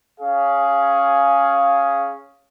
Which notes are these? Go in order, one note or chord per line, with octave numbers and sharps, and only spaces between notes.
C#4 G#4 F5